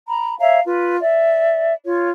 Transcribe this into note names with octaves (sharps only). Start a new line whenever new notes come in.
A#5 B5
C#5 E5 F5 A#5
F4 B4
D5 E5
F4 C#5